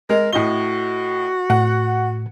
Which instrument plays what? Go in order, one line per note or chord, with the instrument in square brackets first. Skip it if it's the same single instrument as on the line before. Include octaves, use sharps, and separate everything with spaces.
[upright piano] G#3 [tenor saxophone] A#4
[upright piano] A2 D#5 G7 [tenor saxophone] F#4
[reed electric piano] A2 [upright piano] F#5